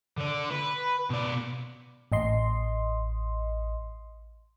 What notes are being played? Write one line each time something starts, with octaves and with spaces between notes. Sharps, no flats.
D3 D5
B4
B2 D5
A1 D#5 C6